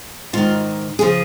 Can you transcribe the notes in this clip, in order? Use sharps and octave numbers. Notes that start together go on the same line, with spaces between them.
G#2 D#3 F4
C#3 F3 G#4